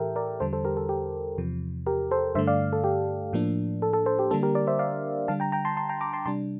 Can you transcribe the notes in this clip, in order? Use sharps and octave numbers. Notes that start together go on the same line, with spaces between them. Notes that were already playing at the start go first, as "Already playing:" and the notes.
Already playing: A2 E3 G4 A4 A#4 E5 G5
A#4 D5
E2 D3 G3 A4 C5
A4 C5
G4 A#4
A4
G4
E2 C3 F3
G4 A#4
A4 C5
G2 D3 A3 C5 E5
D5 F5
A4
G4
A2 F3 A#3 D4
A4
A4
A4 C5
G4
D3 G3 A#3 D4 A4
G4 A#4
A#4 D5
C5 E5
D5 F5
D3 G3 D4 F5 A5
G5 A#5
G5 A#5
A5 C6
A5 C6
G5 A#5
A#5 D6
A5 C6
C3 G3 D4 A5 C6